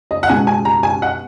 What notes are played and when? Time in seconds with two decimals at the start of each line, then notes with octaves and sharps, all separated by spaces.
0.11 D#5
0.23 F#5
0.29 B2 G#3 B3 G#5
0.47 G#5
0.65 A#5
0.83 G#5
1.02 F#5